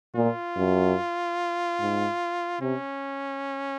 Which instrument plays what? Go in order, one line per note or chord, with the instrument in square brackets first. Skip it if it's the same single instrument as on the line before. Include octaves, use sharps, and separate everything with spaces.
[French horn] A#2 [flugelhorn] F4
[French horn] F#2
G#2
[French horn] C3 [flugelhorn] C#4